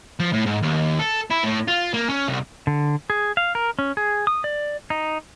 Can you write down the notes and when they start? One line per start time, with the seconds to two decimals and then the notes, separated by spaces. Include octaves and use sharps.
0.20 F3
0.33 A2
0.46 G#2
0.63 D#2
0.99 A4
1.31 E4
1.44 A2
1.68 F4
1.94 A#3
2.09 C#4
2.28 C2
2.67 D3
3.10 G#4
3.37 F5
3.55 A#4
3.79 C#4
3.97 G#4
4.27 D#6
4.44 D5
4.90 D#4